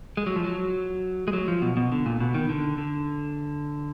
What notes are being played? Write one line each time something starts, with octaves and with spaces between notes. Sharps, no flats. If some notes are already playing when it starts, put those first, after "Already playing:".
G#3
F#3
F3
F#3
G#3
F#3
F3
B2
B2
D3
A#2
B2
D#3
D3
D3